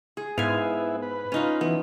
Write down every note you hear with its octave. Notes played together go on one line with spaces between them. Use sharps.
G#4
G#2 B3 E4 F5 G#5
B4
C#4 D#4 F4
E3 B3